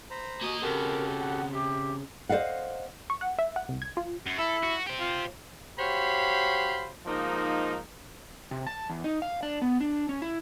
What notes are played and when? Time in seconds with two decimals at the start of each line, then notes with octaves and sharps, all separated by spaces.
0.10 C5 A#5 B5
0.41 A#3 F#4 D#5
0.62 C#3 C4 F#4 G4 A4 A#4
1.20 F#5
1.52 G4 E5
2.29 C5 D5 D#5 F5 F#5
3.10 C#6
3.21 F#5
3.39 E5
3.56 F#5
3.69 C2
3.82 G#6
3.97 F4
4.26 F#2
4.39 E4 A4
4.63 F#4
4.87 G4 C5
5.00 F4
5.79 F#4 G4 C5 C#5 F5 B5
7.06 G#2 F3 A#3 D#4
8.51 C3
8.67 A5
8.90 E2
9.04 D#4
9.22 F5
9.43 D4
9.62 B3
9.81 D4
10.09 C#4
10.22 E4